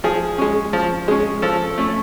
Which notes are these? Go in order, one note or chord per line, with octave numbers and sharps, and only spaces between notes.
F3 G#4
G#3 C#4
F3
G#3 C#4
F3 A4
A3 C#4